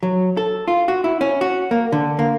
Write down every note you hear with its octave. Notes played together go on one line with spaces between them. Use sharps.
F#3
A4
F4
F#4
E4
C#4
F#4
A#3
D3
A#3